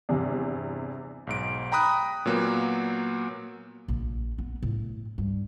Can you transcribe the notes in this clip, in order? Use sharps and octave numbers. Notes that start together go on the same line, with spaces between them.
E2 G2 C3
B1 G#2 D7
G5 A#5 B5 D#6 F#6
A#2 F#3 A#3 B3
A#1
B3
A2
G2